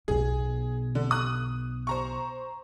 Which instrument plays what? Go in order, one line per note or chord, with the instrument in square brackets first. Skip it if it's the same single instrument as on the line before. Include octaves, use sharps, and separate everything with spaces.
[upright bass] B1 B2 [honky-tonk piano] G#4
[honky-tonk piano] D3
D#6 F#6
C5 A#5 C#6